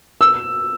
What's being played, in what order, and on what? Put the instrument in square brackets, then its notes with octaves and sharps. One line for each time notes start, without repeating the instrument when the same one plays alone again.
[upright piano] E6